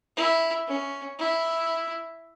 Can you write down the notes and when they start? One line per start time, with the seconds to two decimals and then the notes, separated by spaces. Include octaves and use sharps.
0.17 E4
0.67 C#4
1.19 E4